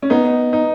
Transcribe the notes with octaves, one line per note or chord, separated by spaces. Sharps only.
C#4
B3 D#4
D#4